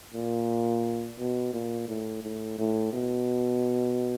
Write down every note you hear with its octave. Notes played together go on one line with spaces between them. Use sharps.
A#2
B2
A#2
A2
A2
A2
B2